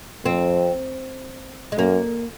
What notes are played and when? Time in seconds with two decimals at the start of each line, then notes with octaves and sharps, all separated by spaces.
0.25 F2 C4
1.72 G#3
1.77 F#2 A#3